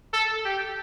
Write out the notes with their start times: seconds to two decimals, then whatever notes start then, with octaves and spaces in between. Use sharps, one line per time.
0.13 A4
0.45 G4